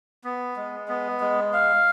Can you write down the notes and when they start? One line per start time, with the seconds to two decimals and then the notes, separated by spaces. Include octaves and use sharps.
0.24 B3
0.56 G#3
0.88 B3
1.20 G#3
1.53 F5